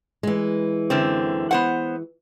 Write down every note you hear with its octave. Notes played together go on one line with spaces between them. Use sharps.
E3 G#3
F#2 D3 C4
B3 C5 F#5